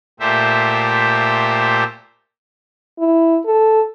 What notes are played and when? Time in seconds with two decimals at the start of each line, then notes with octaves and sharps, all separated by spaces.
0.20 A#2 A3 G4 C5 E5
2.99 E4
3.46 A4